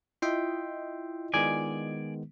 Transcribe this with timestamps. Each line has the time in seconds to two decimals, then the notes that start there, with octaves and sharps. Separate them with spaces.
0.22 E4 F4 D#5 E5 G5 C6
1.34 D#3 G#3 B3 D5 G#5